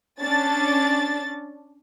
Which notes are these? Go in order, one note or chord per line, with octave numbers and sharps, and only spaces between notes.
C#4 D4 A6